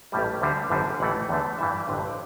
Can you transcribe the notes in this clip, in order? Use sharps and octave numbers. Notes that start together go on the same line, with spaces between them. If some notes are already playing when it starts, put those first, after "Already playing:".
A1 A2 G3
D2 D3 G3
G1 F#2 D3 G3
A1 A2 E3 A3 F#5
E2 D3 A3
G2 E3 G3 E5
D5
A1 G2 D3 B4
C5
D5